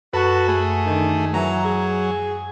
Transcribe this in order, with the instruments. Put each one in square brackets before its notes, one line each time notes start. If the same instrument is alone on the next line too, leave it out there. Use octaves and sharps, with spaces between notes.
[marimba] F#2 [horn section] F#4 [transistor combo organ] A4 B4
[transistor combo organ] A3 G#4
[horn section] D3 D#3
[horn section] E3 A#5 [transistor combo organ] F#3
[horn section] G#4